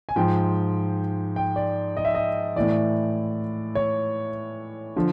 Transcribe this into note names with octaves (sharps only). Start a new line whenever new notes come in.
G#5
G#2 F3 G5
G5
D5
D#5
E5
D#5
A2 E3 D5
C#5
D3 F3